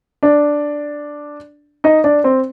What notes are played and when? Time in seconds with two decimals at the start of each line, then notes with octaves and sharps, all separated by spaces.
0.23 D4 D5
1.84 D#4 D#5
2.04 D4 D5
2.24 C4 C5